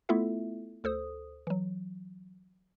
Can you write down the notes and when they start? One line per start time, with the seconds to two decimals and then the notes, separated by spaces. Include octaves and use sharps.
0.09 A3 B3 E4 F4 A4 E5
0.84 D2 A4 C5 D#6
1.47 E3 F#3